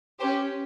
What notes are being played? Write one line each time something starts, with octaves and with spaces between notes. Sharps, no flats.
C#4 G4 C5